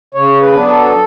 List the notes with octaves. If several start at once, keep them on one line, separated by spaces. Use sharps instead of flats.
C#3 C#5
B4
F#3 B3 D4
A4